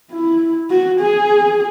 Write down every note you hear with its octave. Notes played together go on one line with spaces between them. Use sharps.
E4
F#4
G#4